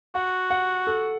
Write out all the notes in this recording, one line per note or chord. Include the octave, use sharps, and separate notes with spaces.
F#4 F#5
F#5
A4